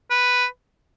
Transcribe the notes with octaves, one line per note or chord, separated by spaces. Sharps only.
B4